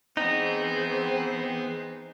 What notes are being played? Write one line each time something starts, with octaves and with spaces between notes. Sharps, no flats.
E3 B3 C4 D#4 G#4 C5